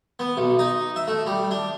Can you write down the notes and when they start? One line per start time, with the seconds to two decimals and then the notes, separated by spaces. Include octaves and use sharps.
0.19 B3
0.37 B1
0.59 D#4
0.96 E5
1.08 A3
1.27 G3
1.51 D4